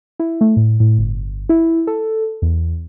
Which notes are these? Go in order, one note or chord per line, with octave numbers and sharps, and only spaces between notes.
E4
A3
A2
A2
G1
E4
A4
E2